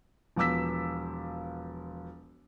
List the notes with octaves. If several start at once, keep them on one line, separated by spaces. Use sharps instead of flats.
E1 F3 B3 D6 E6 B6